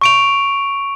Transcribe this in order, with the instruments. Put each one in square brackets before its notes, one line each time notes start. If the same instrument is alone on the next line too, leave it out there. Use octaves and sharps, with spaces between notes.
[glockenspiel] C#6 D7 F7